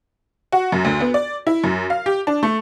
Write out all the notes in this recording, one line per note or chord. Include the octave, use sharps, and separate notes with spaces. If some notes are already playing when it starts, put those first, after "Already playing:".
F#4
F#2
D2
B3
D5
E4
F#2
F5
G4
D4
A3